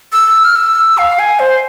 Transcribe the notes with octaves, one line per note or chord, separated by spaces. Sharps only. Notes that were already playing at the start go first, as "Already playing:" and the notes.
E6
F6
E6
F5
G#5
C5